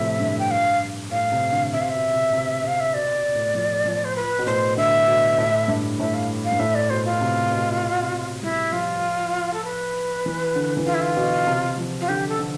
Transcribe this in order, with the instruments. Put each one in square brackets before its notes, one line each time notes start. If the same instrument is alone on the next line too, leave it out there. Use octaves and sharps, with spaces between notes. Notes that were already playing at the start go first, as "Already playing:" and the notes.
Already playing: [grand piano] A2 C3 F3 [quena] E5
[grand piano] G2
[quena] G5
F5
[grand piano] A2 [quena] F5
[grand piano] C3
D3
[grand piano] C3 [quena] E5
[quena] F5
[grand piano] B2 [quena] E5
[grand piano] C3
C3
[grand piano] C3 [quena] F5
[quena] E5
[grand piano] B2 [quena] D5
[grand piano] B2
A2
F3
F3
[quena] C5
B4
[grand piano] B2
[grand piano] A2 [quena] C5
[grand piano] D3 [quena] E5
[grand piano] B2
A2
G2
[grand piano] A2 [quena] E5
[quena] F5
F5
[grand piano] G2
[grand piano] A2 [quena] E5
[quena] D5
[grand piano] B2 [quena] C5
[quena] F4
[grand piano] C3
B2
B2
C3
[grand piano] G3 [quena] E4
[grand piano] F3 [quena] F4
[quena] A4
B4
[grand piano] E3
D3
E3
[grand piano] D3 [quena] F4
[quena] E4
F4
[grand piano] B2
C3
F3
[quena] F4
[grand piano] D3 [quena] G4
[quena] A4
[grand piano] D3